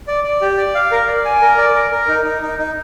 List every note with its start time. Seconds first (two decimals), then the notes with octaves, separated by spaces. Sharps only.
0.08 D5
0.24 D5
0.41 G4
0.57 D5
0.75 F5
0.92 A#4
1.08 D5
1.25 G#5
1.42 A#4
1.58 D5
1.75 A#4
1.91 A#4
2.08 D#4
2.24 D#4
2.42 D#4
2.58 D#4